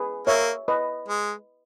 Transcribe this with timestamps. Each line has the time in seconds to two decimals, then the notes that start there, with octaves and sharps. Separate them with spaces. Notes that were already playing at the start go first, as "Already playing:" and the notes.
Already playing: G#4 B4
0.27 A#3 C#5 E5
0.68 B4 D#5
1.08 G#3